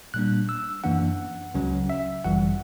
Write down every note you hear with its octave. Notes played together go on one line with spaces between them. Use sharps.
A#2 G3 A#3 D4 F#6
E6
F#2 E3 A#3 D4 F#5
C#2 C#3 F#3 C#4
E5
G1 F#2 E3 G3 F#5